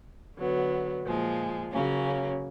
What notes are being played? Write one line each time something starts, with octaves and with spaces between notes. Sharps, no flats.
D3 F#3 B3
A#2 F3 G#3
C#3 F#3 A#3 C#4